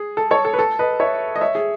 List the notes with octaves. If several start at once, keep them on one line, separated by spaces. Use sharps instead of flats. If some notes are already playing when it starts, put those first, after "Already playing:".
Already playing: G#4
A4
A4 C#5
A4
B4
A4
B4 D#5
C#5 E5
D#5
C#5 E5
G#4